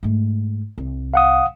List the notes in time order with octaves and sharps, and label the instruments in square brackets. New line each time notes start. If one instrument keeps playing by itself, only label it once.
[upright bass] G#2 A3
C2
[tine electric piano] F5 F#5 D#6